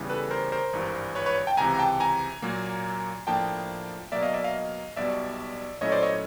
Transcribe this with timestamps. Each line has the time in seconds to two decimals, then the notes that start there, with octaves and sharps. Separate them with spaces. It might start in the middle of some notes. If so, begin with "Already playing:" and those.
Already playing: E2 C#3 E3 G3
0.10 A4 B4
0.31 A#4 C5
0.52 A#4 C5
0.73 G#1 G2 E3
1.15 B4 C#5
1.26 B4 C#5
1.47 G5 A5
1.57 C#2 C3 E3 G#5 A#5
1.74 A#5
1.79 G5 A5
2.00 G#5 A#5
2.42 A#2 F#3 A#3
3.27 A2 F3 A#3 D4 G5 A5
4.12 B2 F#3 A#3 D5 E5
4.22 D#5 F5
4.34 D5 E5
4.44 D#5 F5
4.96 B1 B2 G3 D5 E5
5.81 A#2 F#3 A3 C#4 E4 C#5 D#5
5.92 C5 D5
6.03 C#5 D#5